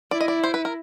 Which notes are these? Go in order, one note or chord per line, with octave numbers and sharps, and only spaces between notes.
E4 D5
D#5
D5
C5
B4
A#4